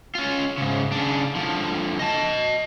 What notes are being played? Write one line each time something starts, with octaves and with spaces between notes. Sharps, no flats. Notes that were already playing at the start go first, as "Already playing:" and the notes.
C#4 F4
G#2 C#3
C#3 D4
D3 F3
D#5 A5